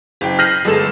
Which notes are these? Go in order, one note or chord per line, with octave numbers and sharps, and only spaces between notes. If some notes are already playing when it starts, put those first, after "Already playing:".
F#1 G5
F6 G6 A#6 C7 D#7 F#7
G1 G#3 A4 E7